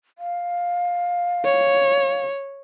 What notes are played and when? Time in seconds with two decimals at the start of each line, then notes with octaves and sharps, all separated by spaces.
0.18 F5
1.45 C#5